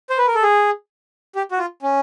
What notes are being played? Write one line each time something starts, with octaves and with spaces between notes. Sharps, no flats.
C5
B4
A#4
A4
G#4
G4
F#4
F4
C#4